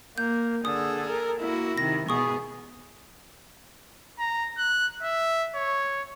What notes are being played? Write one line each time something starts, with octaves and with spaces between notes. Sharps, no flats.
A#3 G6
D3 G#4 A4 D#6
A#4
A#3 E4 F#4
C3 D#3 A#6
B2 B3 G#4 C#6 D#6
A#5
F#6
E5
C#5